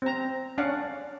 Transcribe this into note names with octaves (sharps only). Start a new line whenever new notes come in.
C4 A#5
C#4 D4 D5 F5 F#5